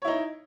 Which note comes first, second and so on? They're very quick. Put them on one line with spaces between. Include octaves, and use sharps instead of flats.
C#5 E4 D#4